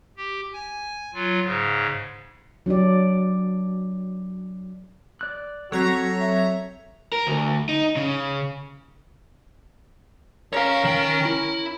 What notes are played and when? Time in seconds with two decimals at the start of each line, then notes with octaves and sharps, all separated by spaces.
0.17 G4
0.53 G#5
1.14 F#3 F4
1.44 G#2 C#3
2.66 F#3 D4 G4 D5
5.21 D5 F#6
5.72 F#3 C4 F#4 A4 C#5 A#5 B6
6.20 E5
7.12 A#4
7.27 D2
7.69 D#4
7.96 C#3
10.53 C#4 A#4 C#5 F5
10.84 D#3 G5
11.25 E4